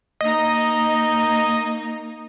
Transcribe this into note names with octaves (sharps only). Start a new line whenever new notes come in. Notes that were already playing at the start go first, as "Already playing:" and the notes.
A#3 D#4 D#5